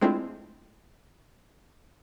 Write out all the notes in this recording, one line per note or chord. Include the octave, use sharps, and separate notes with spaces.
G#3 A3 C4 D4 E4 F4